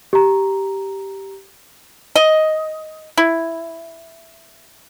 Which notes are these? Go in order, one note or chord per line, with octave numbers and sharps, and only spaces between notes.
G4 A#5
D#5
E4